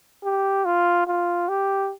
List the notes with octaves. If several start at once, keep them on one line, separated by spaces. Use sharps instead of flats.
G4
F4
F4
G4